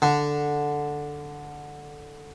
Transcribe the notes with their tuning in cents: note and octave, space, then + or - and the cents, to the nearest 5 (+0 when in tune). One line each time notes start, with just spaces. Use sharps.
D3 +0